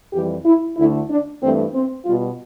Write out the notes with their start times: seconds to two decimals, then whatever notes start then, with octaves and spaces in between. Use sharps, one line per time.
0.13 F2 E3 G3 G4
0.45 E4
0.77 D2 D3 A3 E4
1.09 D4
1.42 G2 E3 A3 C4
1.74 C4
2.05 B2 G3 F4